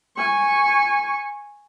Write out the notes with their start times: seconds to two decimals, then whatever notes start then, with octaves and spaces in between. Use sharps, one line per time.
0.17 G#5 C#6